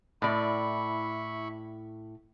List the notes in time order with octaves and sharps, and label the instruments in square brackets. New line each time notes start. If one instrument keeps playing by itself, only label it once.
[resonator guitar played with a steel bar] A2 D5 [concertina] E4 B5 C#6